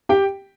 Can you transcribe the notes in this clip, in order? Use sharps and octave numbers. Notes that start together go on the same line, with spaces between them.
G4 G5